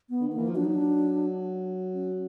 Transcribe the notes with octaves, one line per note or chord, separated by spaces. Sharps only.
B3
D3
D#3 A#3
E3
F3
F#3 D4
D#4
D4
C#4